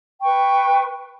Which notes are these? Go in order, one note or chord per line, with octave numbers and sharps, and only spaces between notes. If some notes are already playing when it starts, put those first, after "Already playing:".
B4 G5 C#6